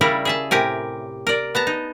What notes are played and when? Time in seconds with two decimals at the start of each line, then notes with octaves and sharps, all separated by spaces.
0.01 C#3 G3 E4 A#4 C#5 D5
0.25 G#4 E5 A5
0.51 A2 C3 G4 A#4 G#5
1.27 A#4 D5
1.55 B3 A5 A#5
1.67 D#4